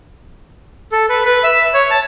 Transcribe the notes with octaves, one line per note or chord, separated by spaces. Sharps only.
A4
B4
B4
E5
C#5
A5